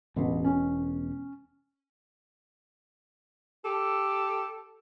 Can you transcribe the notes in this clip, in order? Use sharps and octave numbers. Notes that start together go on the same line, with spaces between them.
E1 A1 B2
C#4
G4 A4